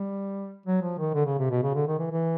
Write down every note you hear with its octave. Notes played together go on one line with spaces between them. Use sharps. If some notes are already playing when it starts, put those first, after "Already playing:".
Already playing: G3
F#3
F3
D#3
D3
C#3
C3
B2
C#3
D3
D#3
E3
E3